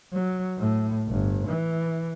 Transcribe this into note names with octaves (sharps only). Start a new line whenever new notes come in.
F#3
A2
G1
E3